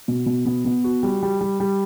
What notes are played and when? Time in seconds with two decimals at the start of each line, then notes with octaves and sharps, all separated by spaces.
0.08 B2
0.26 B2
0.45 B3
0.65 B3
0.84 F#4
1.03 G3
1.23 G3
1.41 G3
1.60 G3